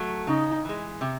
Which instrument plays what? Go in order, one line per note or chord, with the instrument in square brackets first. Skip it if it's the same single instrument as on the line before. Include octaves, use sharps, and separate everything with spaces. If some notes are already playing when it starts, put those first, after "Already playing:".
Already playing: [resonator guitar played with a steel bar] F#3 A3
[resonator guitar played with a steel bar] C#3 [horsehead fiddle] D#4
[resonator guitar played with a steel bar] E3 G#3
C3